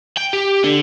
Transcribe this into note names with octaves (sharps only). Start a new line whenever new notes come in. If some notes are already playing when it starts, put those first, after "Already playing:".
G5
G4
D3